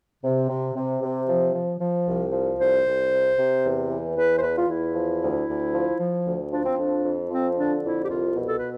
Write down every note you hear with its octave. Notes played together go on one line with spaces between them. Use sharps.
C3
C3
C3
C3
F3
F3
F3
C2
F3
C2 C5
C2
C3
C3
E2
E3
E2 B4
C5
E2 B4
F4
E2 E4
F3
D2
D2
F3
F3
D2
F3 D4
C4
F2 D4
F2
F3 C4
D3 D4
F2 E4
G4
C2 F4
B2
A4
B4